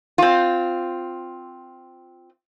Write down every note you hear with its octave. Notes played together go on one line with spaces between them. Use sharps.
C4 F4